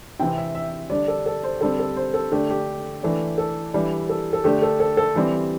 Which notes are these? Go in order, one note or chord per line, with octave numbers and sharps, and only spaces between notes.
C3 E3 C4 G5
E5
E5
D3 G3 D4 D5
A4
A4
C5
D3 G3 C4 A4
A4
C5
A4
D3 A3 D4 G4
G4
E3 A3 D4
A4
E3 G3 D4
A4
A4
D3 A3 D4 G4
A4
A4
A4
E3 G3 C4